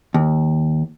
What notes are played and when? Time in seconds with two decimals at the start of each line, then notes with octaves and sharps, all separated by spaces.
0.14 D#2